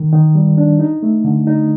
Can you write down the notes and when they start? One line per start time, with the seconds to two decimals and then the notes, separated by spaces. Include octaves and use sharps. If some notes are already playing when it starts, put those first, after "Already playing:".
Already playing: D#3
0.13 D#3
0.35 G3
0.58 D4
0.79 D#4
1.03 A3
1.24 D3
1.47 D#4